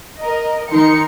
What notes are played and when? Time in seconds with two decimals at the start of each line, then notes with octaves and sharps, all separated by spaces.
0.20 A#4 D#5
0.70 D#3 D#4 A#4 C6 C#7